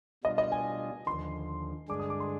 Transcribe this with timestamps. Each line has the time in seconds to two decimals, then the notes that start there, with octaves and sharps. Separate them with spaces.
0.24 B2 G3 D4 F4 D#5
0.38 D#5
0.52 G#5
1.07 D#2 D3 F3 C6
1.89 G2 D3 G#3 D4 G#4 D6
2.00 D#6
2.10 D6
2.20 C6